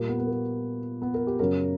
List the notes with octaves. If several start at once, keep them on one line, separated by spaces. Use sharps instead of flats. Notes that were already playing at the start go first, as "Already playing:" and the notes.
Already playing: A#2 G3 A#3
B3
B3
A#3
B3
A#4
G4
F#2 C#3 F#3 A#4